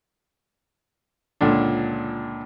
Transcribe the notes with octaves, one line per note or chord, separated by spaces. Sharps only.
C#2 A#2 D3 D4